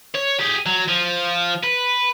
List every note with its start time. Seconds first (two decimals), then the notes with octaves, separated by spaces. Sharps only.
0.15 C#5
0.39 G4 G#4
0.66 F#3
0.88 F3
1.63 B4